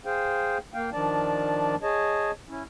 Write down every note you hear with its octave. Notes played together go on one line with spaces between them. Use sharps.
G#4 C5 F5 G5
A#3 F5 G5
D#3 F3 D4 D5 A5
G#4 C#5 D#5 A5
C#4 E4